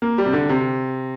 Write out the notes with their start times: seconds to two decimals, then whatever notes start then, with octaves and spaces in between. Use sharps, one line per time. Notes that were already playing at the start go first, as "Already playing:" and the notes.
0.02 A#3
0.18 G3
0.26 C3
0.33 D3
0.49 C3